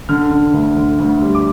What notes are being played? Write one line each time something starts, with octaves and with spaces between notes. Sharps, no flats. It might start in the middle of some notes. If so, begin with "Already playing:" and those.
D3 F6
D3
D2
D3
D2
G3
D6